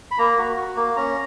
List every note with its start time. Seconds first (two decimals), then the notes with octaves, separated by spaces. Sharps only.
0.11 B5
0.18 A#3 A#5
0.38 F#4
0.57 F#4
0.76 A#3
0.96 C#4 A#5